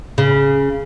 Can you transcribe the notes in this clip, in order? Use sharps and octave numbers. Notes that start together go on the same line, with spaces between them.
C#3